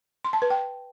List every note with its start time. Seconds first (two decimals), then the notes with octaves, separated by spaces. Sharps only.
0.25 C6
0.33 A5
0.42 B4
0.50 G5